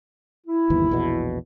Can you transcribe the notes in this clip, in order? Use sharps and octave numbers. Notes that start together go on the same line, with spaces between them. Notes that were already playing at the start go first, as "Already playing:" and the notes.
E4
G1 D#2 E3
A#1 E2 B2